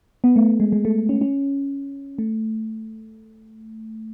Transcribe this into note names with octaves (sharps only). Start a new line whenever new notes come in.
B3
A3
G#3
G#3
A3
C#4
C#4
A3